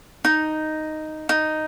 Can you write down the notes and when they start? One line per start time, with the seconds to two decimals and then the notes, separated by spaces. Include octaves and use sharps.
0.25 D#4
1.29 D#4